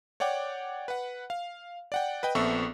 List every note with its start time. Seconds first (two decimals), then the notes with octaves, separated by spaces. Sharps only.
0.20 C#5 D5 F#5 G5 D6
0.88 B4 F#5
1.30 F5
1.92 D5 F#5 G5
2.23 B4 D#5 G5
2.35 A#1 B3 C4 A4 E5 C#6